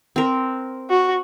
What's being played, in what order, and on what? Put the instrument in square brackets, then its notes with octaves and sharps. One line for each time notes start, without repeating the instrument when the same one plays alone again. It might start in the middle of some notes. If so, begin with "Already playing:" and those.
[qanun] C4 A#4
[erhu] F#4